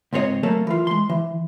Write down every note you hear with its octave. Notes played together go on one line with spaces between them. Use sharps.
C#2 G#2 C4 C#5 D#5
F#3 A3 A#3 A4
E3 F4
G#3 C6
E3